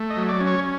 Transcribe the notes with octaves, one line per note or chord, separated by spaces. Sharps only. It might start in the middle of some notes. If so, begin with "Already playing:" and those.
Already playing: A3
D#5
F#3
D5
C#4
C#5